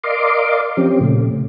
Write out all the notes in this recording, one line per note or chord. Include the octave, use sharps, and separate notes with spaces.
A#4 D5 D#5 F5 C6 D6
F3 C4 C#4 G4
A#2 C#3 A3